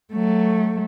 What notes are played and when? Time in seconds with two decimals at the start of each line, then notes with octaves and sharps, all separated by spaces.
0.13 F#3 A3